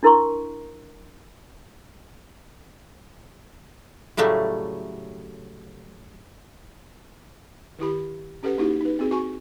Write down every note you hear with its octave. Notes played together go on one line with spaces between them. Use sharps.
D4 E4 A#4 A#5 C6 C#6
A2 C#3 F#3 G3 A3
D#3 E4 G4 B5
C#4 G4 A4 B4 F#5
A#3 D#4 E4 F#4 G4
D#4 B4
C4 F#4 G#4
F#4 G#5 C#6